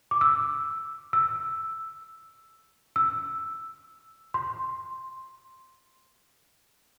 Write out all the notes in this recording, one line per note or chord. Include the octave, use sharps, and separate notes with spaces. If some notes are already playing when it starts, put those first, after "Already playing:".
D6
E6
E6
E6
C6